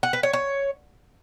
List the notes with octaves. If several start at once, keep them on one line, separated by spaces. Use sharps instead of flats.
F#5
B4
C#5
C#5